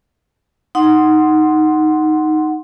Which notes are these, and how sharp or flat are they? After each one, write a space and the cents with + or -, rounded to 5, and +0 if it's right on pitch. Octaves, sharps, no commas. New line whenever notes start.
D#4 +0 F#5 +0 C6 +0